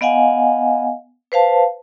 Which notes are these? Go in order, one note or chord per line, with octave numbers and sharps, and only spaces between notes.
B3 D#5 F5 F#5 G#5
B4 C5 F5 A5